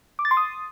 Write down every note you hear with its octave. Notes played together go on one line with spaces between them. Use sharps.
D6
A6
C6
D#6